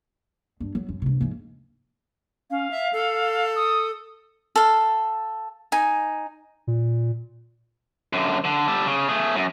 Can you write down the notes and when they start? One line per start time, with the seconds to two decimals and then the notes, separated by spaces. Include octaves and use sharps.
0.60 G2
0.75 F#3
0.89 F#2
1.02 G2 C3
1.21 G#2 F3
2.51 C#4 F5
2.71 E5
2.93 A4
3.55 D#6
4.56 A4 F5
5.72 D#4 G#5
6.67 A#2
8.13 F#2 D3
8.44 D3
8.68 G3 A4
8.86 C#3
9.09 A3 G#4
9.36 F#2